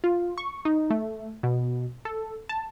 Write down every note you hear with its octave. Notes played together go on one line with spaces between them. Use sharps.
F4
C#6
D#4
A3
B2
A4
A5